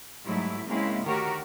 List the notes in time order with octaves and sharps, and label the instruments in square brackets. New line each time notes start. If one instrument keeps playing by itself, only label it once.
[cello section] G#2 F#3 G3 A3 E4
G#2 C#3 G#3 A#3 C4 E4
D2 D#3 F#4 G4 A#4 C#5